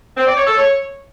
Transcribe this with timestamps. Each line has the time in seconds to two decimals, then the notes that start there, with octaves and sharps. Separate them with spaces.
0.17 C4
0.27 D5
0.37 C#5
0.47 A4
0.57 C#5